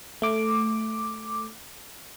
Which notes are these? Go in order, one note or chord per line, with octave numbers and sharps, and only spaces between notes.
A3 D6